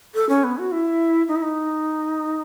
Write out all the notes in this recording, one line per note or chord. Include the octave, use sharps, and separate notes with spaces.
A4
C#4
B3
F#4
E4
D#4
E4
D#4